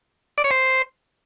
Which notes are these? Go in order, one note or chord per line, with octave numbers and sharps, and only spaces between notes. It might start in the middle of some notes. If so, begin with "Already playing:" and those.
D5
C#5
C5